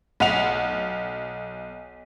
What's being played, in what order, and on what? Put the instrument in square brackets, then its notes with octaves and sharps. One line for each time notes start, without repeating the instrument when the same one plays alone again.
[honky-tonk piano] B1 F#5 F7